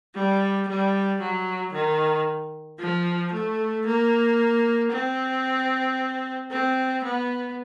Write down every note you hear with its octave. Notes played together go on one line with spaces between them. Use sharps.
G3
G3
F#3
D#3
F3
A3
A#3
C4
C4
B3